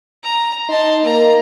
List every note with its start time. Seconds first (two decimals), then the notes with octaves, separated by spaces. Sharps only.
0.24 A#5
0.69 D#4 A5 C6
1.04 A#3 A#5